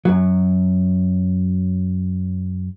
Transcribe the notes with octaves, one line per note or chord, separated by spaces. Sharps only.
F#2 F#3